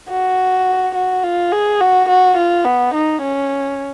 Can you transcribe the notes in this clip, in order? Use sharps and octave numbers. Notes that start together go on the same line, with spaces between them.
F#4
F#4
F4
G#4
F#4
F#4
F4
B3
D#4
C#4